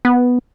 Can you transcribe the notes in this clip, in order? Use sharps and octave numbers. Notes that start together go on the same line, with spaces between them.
B3